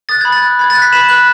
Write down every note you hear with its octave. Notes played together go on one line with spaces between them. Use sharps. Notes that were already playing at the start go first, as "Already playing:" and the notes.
D#6 F#6 A6
B5 G#6
A6
F#6
B5 G#6
A6
F#6
B6
B5 E7
F#6 F#7